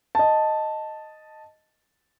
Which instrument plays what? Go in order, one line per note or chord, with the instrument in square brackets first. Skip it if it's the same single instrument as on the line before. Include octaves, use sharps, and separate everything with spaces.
[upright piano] D#5 A5